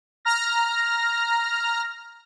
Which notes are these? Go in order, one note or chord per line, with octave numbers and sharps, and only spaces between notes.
A#5 F6 A#6